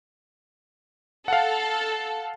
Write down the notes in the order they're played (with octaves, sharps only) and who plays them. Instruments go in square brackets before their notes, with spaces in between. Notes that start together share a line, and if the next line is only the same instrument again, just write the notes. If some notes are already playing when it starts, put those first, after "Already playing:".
[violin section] A4 [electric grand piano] F5 F#5